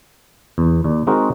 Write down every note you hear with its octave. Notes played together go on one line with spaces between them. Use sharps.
E2
D#2 D5
G#3 C4 D#4 F#4 A#4